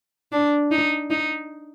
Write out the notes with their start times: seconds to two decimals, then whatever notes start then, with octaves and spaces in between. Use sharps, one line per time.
0.32 D4
0.71 D#4
1.10 D#4